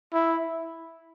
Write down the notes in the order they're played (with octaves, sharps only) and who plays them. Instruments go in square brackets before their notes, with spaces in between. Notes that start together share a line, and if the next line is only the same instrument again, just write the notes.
[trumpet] E4